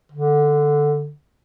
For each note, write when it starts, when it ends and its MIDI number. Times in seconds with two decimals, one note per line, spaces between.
0.12 1.13 50